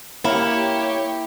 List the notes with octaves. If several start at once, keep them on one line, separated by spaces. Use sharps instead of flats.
A#3 E4 G4 C#5